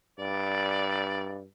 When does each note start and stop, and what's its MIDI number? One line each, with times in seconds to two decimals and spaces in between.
0.19 1.45 43
0.19 1.35 74